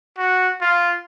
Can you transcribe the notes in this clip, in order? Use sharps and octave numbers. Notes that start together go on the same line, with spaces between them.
F#4
F4